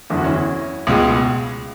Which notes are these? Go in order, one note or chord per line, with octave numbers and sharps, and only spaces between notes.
F#1 E2 D3 E4
F#4
C#4 E4
C#2 B2 G#3